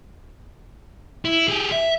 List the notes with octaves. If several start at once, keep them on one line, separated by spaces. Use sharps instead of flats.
E4
G4 G#4
E5